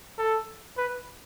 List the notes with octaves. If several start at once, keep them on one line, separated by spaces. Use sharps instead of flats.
A4
B4